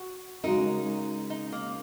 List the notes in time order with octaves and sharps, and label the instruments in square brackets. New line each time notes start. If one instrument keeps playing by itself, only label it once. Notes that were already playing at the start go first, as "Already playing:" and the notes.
Already playing: [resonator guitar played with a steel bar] F#4
[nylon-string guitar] C#3 G#3 F#4 A#4 [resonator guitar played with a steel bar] D#4
[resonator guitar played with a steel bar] D#4
A#3